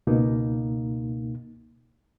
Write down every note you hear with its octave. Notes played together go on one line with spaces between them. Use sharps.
C#2 B2 A#3 D#4